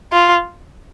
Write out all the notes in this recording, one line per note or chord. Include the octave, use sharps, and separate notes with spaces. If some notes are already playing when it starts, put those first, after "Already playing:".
F4